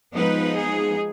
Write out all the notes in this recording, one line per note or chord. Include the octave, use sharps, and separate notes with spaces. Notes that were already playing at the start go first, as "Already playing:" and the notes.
F3 G#3 B3 D#4 B4
G#4